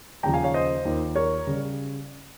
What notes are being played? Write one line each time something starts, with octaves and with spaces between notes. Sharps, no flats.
D#2 C#3 F3 G5 A#5
F5 G#5
C#5 F5
C5 D#5
D#2 D#3 A#3 F4
A#4 C#5
C#3 G3